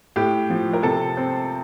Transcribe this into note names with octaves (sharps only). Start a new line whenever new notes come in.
A2 G4
F3
A#4
C3 A4
C4